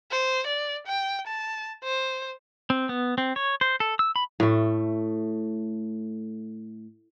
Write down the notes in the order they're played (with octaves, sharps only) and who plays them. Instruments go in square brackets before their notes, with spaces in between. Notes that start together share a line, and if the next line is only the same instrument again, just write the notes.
[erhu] C5
D5
G5
A5
C5
[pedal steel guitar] C4
B3
C4
C#5
C5
A4
E6
B5
[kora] A2 A3